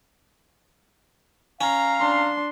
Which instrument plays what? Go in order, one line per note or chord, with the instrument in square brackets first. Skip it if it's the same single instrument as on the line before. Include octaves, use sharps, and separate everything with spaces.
[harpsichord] C#4 [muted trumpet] F5 [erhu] A#5
[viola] D4 C6